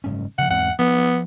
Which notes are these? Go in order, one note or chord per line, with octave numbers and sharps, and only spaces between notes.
F#1 G#2 C#4
C#3 F3 F#5
E2 G#2 C4 F#5
F3 B3